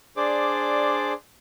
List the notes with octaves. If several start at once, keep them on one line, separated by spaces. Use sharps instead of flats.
D4 G#4 C5 D5 D6